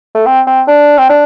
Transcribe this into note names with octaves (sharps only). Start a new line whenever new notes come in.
A3
C4
C4
D4
C4
D4